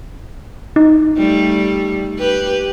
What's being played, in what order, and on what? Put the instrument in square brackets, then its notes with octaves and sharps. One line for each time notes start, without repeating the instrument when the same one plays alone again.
[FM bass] D#4
[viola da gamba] G3 A3
G4 B4